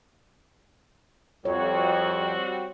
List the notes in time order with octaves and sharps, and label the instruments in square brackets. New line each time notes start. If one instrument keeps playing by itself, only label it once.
[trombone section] F2 [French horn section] G3 C4 F#4 [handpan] C#5